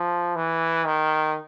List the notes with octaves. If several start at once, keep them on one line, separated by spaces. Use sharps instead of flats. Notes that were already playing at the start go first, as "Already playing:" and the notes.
Already playing: F3
E3
D#3